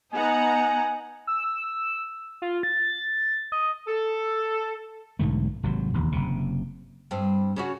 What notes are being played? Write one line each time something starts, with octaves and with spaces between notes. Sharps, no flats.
B3 D#4 F#5 G#5 A#5
E6
F4
A6
D#5
A4
B1 G#2 D3 A3
G#1 C3 F#3
E1 D#2
F#1 C3
G2 C4
C#3 C#4 F#4